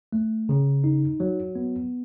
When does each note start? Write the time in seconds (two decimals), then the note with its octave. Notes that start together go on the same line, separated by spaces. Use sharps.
0.13 A3
0.49 C#3
0.84 D#4
1.20 F#3
1.55 B3